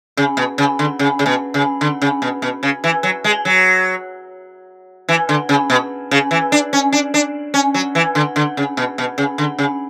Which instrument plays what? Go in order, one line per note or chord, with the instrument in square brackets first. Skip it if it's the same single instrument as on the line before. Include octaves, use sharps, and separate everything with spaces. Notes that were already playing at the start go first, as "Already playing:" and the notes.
[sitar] C#3
B2
C#3
D3
C#3
C#3
B2
C#3
D3
C#3
B2
B2
C#3
E3
F#3
G#3
F#3
E3
D3
C#3
B2
C#3
E3
D4
C#4
D4
D4
C#4
F#3
E3
D3
D3
C#3
B2
B2
C#3
D3
C#3